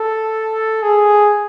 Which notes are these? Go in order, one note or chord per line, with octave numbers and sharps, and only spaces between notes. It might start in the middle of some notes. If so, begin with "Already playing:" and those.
Already playing: A4
G#4